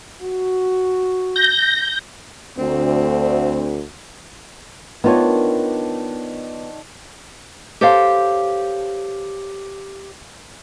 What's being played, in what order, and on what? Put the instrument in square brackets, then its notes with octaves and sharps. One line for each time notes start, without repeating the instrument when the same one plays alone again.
[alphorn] F#4
[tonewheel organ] G6 A#6
[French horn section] D2 [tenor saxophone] C4
[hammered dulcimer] D#3 D4 [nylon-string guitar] B3 F4 C#5
[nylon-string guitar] G4 A4 C5 C#5 F5